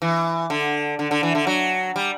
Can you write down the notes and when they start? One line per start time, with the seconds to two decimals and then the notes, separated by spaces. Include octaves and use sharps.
0.02 E3
0.50 D3
0.99 D3
1.11 D3
1.23 E3
1.35 D3
1.47 F#3
1.96 G3